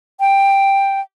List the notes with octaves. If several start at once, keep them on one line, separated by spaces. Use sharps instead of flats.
G5